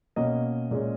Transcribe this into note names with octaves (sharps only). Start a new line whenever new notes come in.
B2 A#3 C#4 D#5
A#2 G#3 C#4